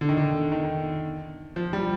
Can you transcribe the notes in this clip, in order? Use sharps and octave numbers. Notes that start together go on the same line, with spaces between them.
D3
D#3
D3
D#3
F3
G3